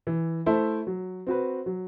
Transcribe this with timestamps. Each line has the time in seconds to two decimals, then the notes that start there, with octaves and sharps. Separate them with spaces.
0.07 E3
0.46 A3 E4 A4 C5
0.87 F#3
1.27 C4 F#4 B4
1.66 F#3